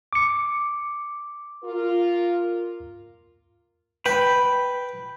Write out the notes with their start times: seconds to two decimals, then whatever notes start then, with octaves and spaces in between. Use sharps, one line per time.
0.13 D6 C#7
1.62 F4 A#4
4.06 B4 G5 B5